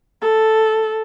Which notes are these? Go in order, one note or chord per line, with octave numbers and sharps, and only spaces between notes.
A4